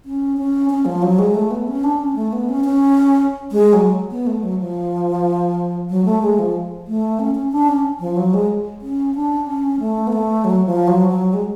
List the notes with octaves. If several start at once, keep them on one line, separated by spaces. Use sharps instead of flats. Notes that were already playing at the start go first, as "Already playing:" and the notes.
C#4
C#4
C#4
F3
F#3
G#3
A3
B3
C#4
D4
C#4
A3
B3
C#4
C#4
G#3
F#3
B3
A3
F#3
F3
F#3
A3
G#3
F3
A3
C#4
C#4
D4
C#4
F3
F#3
G#3
C#4
D4
C#4
A3
B3
A3
F#3
F3
F#3
F#3
G#3